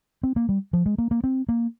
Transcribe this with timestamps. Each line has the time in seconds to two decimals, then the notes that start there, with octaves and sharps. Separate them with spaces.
0.23 C4
0.36 A#3
0.49 G3
0.73 F3
0.86 G#3
0.98 A#3
1.11 A#3
1.24 C4
1.49 A#3